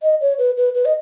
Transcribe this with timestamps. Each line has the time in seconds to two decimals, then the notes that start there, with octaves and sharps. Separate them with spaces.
0.02 D#5
0.21 C#5
0.38 B4
0.57 B4
0.75 B4
0.85 D#5